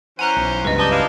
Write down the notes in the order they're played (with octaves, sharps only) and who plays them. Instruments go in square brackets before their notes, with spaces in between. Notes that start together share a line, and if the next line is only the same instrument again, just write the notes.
[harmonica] E3 C#4 C5 [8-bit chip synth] F#5 C#7 [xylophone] G#5 A#5 F#6
[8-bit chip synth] B1
[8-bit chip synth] C#2 G2 [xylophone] B4 D#5
[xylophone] B4 C6 G6 [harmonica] D5 A5 D#6
[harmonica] D4 E4 F5